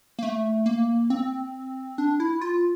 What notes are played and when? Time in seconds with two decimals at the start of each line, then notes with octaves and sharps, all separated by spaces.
0.19 A#3
0.23 A3
0.66 A#3
1.10 C4
1.98 D4
2.20 E4
2.41 F4